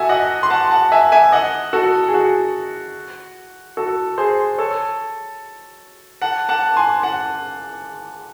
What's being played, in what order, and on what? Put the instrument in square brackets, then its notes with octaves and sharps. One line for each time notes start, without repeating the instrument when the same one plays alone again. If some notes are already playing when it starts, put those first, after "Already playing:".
Already playing: [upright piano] F#4 A4 E5 G#5
D#5 F#5
C6
F#5 A5
F#5 A5
E5 G#5
E5 G#5
D#5 F#5
F#4 A4
G#4
F#4
F#4 A4
G#4 C5
A4 C#5
F#5 A5
F#5 A5
G#5 C6
F#5 A5